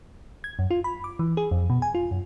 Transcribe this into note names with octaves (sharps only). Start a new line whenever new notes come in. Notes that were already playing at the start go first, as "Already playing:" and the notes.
G#6
F#2
F4
B5
D6
E3
G#4
F2
B2
G#5
F4
F#2